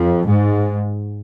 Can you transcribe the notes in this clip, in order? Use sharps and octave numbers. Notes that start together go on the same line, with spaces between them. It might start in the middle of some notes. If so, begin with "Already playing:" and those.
Already playing: F2
G#2